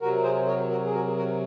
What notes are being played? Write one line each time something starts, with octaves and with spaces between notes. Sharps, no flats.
C3 F#3 F#4 A#4
G#4 C5
A#4 C#5
F#4 A#4
G#4
F#4 A#4
F#4 A#4